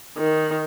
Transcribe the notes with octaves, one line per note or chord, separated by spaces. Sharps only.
D#3